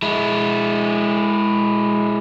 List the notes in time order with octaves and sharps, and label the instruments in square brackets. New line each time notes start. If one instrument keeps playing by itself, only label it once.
[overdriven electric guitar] G#3 E4